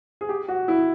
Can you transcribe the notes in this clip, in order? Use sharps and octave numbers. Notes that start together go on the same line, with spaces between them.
G#4
G4
F#4
E4